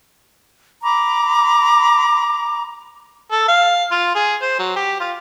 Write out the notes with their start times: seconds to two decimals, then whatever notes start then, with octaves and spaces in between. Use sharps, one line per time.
0.83 A#5 B5 D6
3.32 A4
3.48 F5
3.92 F4
4.15 G#4
4.41 C5
4.59 F#3
4.76 G4
5.00 F4